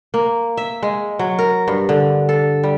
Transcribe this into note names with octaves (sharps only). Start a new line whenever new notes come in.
A#3
E5
G#3
F#3
A#4
G2
D3
A4
G3